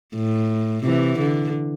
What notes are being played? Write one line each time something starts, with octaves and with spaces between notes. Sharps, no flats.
A2
C3 E3
D3